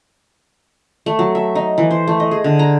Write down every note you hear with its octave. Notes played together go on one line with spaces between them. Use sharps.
A3
F#3
E5
D#4
E3
C5
A3
D#5
G#4
D3
A#5